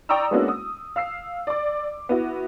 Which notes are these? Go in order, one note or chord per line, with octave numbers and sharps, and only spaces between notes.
D5 G5 A#5 C#6 D#6 E6
G#3 A#3 B3 C#4 D4 F#4
D#6
F5 E6 C7
D5 D6
B3 E4 F#4